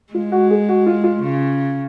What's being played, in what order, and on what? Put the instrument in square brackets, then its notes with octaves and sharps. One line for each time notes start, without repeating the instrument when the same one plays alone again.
[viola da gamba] G#3 [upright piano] F4
[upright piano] F#4
G#4
F#4
F4
F4
[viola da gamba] C#3